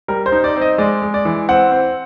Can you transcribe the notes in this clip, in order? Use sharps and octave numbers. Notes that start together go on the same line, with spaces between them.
G3 A#4
C5
D#4
D5
C4
D#5
G#3 D5
G#3
D5
E3
C4 F#5
C4